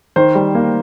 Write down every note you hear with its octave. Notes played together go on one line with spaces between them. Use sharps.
D#3 C5
G3
A#3